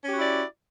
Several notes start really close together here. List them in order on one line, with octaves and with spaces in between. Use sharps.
C#4 G4 F#4 E4 D5